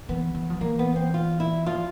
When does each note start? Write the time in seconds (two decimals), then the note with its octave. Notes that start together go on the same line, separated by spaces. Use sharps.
0.09 E3 B3
0.35 E3
0.50 F3
0.61 E3 A#3
0.79 B3
0.96 C4
1.14 F4
1.40 E4
1.66 F3 F4